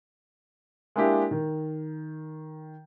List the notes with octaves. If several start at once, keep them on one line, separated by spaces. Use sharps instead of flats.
G#3 A#3 D4 E4 G4
D#3